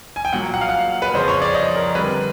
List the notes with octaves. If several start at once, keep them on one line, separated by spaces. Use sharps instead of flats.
G#5
G5
A#2 F#3 A#3 F#5
F#5
F5
F#5
B4
F2 C#3 F3 C5
C#5
D5
D#5
A#4
D3 G3 C4 B4